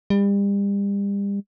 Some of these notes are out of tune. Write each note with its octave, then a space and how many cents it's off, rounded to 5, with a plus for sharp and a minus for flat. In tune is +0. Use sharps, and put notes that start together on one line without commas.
G3 +35